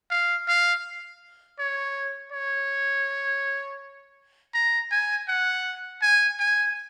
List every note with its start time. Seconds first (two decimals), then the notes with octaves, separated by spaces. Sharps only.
0.10 F5
0.48 F5
1.59 C#5
2.32 C#5
4.54 A#5
4.91 G#5
5.28 F#5
6.02 G#5
6.39 G#5